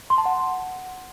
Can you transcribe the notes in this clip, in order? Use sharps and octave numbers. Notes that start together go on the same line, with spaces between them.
C6
A5
F#5